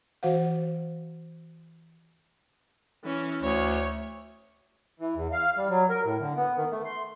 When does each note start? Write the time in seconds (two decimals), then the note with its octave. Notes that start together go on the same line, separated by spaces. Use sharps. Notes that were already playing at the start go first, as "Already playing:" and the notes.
0.23 E3 F#4 C5 F5 F#5
3.04 E3 C#4
3.42 D2 C#5
5.00 E3
5.15 E2
5.32 F5
5.58 G3
5.70 F#3
5.90 A#4
6.05 A2
6.20 D3
6.37 B3
6.57 D#3
6.71 A3
6.85 C6